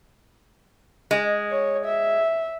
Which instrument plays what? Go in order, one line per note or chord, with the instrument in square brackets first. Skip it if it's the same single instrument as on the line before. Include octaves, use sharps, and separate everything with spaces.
[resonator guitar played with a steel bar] G#3
[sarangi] C#5
E5